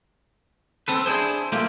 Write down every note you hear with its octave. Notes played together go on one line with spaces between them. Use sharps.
C4 A4 B4
D4 E4 G#4 C5
A3 A#3 F4 G4